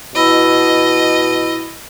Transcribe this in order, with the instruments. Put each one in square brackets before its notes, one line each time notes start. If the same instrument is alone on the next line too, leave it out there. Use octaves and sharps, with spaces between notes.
[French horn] B2 [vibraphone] E4 B5 E6 [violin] D#5